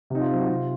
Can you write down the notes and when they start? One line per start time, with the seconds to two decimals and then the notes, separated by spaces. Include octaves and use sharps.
0.10 C3 D#4
0.21 F4
0.30 F#3 C4
0.39 F#4
0.49 C3 F4